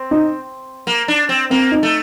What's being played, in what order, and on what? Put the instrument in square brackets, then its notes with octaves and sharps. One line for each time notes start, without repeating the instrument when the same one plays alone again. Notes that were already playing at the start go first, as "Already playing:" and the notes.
Already playing: [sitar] C4
[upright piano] D#4
[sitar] A#3
D4
C4
[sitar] A#3 [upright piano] C4
[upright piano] D#4
[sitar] A3